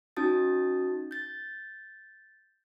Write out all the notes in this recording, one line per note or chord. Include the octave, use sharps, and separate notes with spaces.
C#4 D#4 F#4 A5 D#6 A6
G6 A6